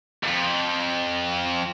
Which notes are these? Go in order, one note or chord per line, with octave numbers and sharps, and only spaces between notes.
F2 G#2